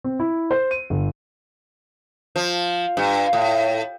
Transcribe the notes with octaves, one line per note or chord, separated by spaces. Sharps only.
C4
E4
C5
D#7
G1
F3
G2
A2